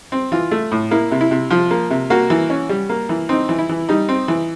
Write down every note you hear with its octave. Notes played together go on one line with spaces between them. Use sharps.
C4
E3 F4
A3
A2
A#3 E4
C3
E4
C3
F3 F4
A#3
C3
A#3 F#4
E3
C#4
G3
A#3
E3
C4 D#4
E3
E4
E3
G3 D#4
C4
E3